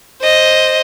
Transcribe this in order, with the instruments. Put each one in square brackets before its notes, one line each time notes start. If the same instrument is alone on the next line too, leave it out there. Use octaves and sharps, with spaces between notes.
[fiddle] C5 D#5